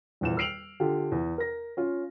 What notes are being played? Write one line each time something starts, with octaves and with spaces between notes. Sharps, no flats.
D#1 E2 E7
E6 F6 C7 D7 F7 F#7
D3 F4 G4
E2
A#4 A#6
C#4 F4